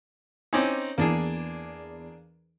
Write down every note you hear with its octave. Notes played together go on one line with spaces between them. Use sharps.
C4 C#4 D#4 G#5 D6
E2 A#3 D4 G#4